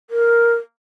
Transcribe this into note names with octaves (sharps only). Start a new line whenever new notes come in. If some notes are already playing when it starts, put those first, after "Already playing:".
A#4